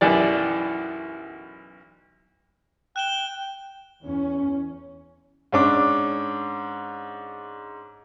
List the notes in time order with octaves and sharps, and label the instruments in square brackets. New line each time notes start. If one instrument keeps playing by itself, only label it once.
[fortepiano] B1 F#2 E3 G4 D5
[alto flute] G5 [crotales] F#6 E7 G7
[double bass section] E2 C#4
[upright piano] G#2 C#4 D4 D6